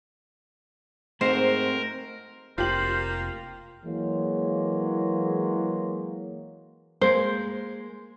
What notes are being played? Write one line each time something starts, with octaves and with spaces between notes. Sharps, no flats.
G#2 A3 C4 F#4 A#4 C5
F1 A#3 F4 G4 C5 F#7
E3 F#3 G#3 A#3
G#3 A#3 A#4 C5